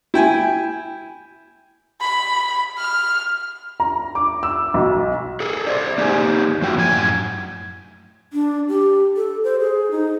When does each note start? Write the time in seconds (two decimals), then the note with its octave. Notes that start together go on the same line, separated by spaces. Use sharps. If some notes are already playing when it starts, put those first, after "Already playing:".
0.14 E4 G5 G#5
2.01 B5
2.78 F6
3.80 A#5
4.15 D6
4.43 E6
4.74 B1
5.40 G#4 A4
5.66 C5 D5
5.98 A#3 D#4 G4 G#4 G#5
6.62 F#2 F3 A3 F#4 G5
6.76 F#2 A2 G4 G#5
8.33 D4
8.68 G4
9.17 A4
9.44 C5
9.60 G#4
9.91 D#4